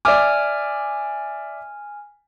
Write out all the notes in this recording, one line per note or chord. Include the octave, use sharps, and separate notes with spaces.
D5 E5 G#5 D6 F6